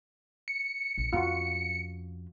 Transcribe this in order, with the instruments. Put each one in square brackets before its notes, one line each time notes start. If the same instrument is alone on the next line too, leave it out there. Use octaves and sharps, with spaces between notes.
[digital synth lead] C#7
[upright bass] A#1
[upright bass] F2 C#4 [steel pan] F4 F#4